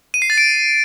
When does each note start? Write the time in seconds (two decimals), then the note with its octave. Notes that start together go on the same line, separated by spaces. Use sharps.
0.14 D#7
0.22 C7
0.30 A6
0.38 D7